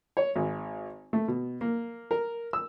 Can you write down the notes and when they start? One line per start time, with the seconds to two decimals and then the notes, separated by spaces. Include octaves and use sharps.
0.17 C#5
0.36 G#1
1.13 A3
1.28 B2
1.61 A#3
2.11 A#4
2.53 E6